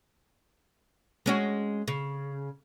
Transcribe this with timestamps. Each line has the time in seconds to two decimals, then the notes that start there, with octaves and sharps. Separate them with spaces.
1.26 G#3 C#4 F#4
1.88 C#3